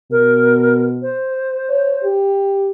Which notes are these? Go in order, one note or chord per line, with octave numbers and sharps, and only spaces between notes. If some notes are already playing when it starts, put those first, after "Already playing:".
B2 A#4
C5
C#5
G4